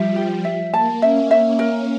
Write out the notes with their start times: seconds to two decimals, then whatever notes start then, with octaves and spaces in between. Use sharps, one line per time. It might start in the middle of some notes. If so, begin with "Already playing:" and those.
Already playing: F3 G3 E5
0.16 G4
0.45 E5
0.74 A#3 A5
1.02 C#4 E5
1.31 E5
1.59 A#4